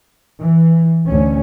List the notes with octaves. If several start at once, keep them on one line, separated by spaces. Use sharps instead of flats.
E3
D2 C#4